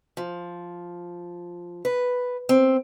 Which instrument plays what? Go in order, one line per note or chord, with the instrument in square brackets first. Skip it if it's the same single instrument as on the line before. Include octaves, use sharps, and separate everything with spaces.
[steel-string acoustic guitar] F3
B4
C4